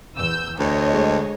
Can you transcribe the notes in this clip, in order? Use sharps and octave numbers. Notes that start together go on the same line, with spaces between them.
E2 E6 G6
D2 C#5 D#5
G#3